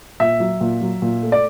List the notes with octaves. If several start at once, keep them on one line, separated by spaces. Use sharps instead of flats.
A#2 E5
F#3
A#2
F#3
A#2
A3
D5